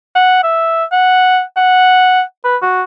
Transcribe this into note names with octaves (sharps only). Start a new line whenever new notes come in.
F#5
E5
F#5
F#5
B4
F#4